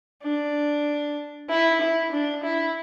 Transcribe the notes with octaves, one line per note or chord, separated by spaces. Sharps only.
D4
E4
E4
D4
E4